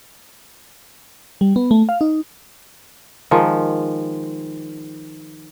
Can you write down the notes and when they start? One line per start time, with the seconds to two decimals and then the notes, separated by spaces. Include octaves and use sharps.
1.41 G3
1.56 B3
1.71 A3
1.89 F5
2.01 D#4
3.31 D#3 F3 G#3